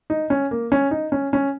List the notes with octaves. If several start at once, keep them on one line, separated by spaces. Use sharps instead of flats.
D#4
C#4
A#3
C#4
D#4
C#4
C#4